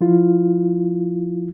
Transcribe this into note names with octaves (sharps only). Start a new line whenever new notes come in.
F3 E4 F4